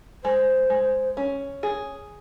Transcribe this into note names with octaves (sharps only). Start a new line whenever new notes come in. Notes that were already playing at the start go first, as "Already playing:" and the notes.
G#3 C5
G#3
C#4
G#4